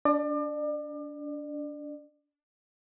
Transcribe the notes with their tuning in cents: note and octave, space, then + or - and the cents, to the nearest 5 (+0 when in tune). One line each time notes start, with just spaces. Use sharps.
D4 -20 D5 +35